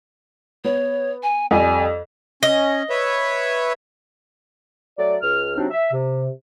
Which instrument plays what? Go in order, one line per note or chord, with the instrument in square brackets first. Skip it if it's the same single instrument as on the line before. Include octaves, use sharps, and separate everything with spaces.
[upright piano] B3 [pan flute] C#5
[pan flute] G#5
[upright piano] F2 G3 [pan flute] G#5
[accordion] C#4 [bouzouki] D#5
[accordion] B4 C#5 E5
[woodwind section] F#3 A3 D5
C#2 F6
C3 F#3 C4 D4 D#4
E5
C3